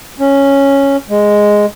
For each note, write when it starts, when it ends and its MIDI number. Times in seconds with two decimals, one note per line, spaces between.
0.19 0.97 61
1.09 1.66 56